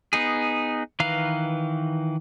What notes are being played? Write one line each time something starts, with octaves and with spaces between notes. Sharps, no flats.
B3 D#4 G#4
D#3 E3 B4 F5 A#5